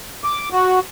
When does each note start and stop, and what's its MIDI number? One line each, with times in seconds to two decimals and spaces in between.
0.24 0.49 86
0.53 0.79 66